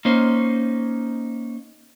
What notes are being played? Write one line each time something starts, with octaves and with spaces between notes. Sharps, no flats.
A#3 C#4 D#4 C5